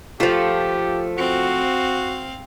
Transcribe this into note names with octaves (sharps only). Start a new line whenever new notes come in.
F3 A3 F4 G4 A4
C4 F#4 F5